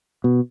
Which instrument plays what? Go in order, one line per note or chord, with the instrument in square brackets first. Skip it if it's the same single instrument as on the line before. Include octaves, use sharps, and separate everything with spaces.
[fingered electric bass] B2